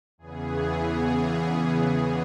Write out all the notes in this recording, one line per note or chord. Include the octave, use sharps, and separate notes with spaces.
E2 C#3 E3 B3 G#4